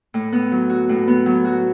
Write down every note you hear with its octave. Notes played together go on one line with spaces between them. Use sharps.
A2
B3
F#3
F#4
A2
B3
F#3
F#4